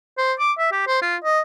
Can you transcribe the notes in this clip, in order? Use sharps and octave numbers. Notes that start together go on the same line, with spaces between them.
C5
D6
E5
G4
C5
F4
D#5